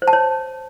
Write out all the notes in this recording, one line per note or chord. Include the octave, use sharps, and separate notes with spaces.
C5
A5
C#5